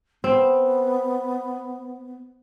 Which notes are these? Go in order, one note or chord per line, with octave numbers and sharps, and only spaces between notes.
B3 C4